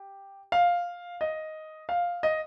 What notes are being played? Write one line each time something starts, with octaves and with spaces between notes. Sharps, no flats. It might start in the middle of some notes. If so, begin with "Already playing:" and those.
Already playing: G4
F5
D#5
F5
D#5